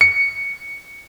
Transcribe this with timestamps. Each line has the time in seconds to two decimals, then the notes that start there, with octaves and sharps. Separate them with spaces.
0.01 C#7